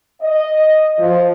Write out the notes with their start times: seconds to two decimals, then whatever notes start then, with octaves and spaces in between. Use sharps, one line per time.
0.21 D#5
0.98 F3